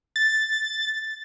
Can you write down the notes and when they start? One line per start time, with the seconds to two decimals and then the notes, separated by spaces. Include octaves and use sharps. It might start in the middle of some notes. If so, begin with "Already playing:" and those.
0.16 A6